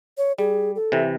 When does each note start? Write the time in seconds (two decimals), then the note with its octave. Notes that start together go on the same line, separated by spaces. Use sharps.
0.18 C#5
0.38 G3 G#4
0.75 A4
0.92 C3 E3